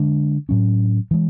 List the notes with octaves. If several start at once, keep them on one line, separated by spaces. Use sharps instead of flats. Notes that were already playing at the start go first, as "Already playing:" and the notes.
Already playing: D3 G#3 D4
A2 F#3 C#4
E3 G#3